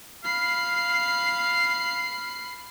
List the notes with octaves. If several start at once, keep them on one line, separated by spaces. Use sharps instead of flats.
F5 B5 C7